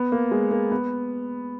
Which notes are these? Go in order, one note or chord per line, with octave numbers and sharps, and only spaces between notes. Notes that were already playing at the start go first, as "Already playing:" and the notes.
Already playing: B3
A#3
G#3
A#3
B3